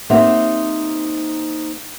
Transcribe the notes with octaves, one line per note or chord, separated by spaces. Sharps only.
A#3 C4 D#4 G4 E5 F#5